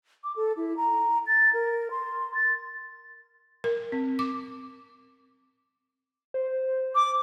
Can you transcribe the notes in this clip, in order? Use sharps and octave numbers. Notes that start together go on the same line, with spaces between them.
D6
A4
E4
A#5
A6
A#4
C6
A6
A#4
C4
D6
C5
D6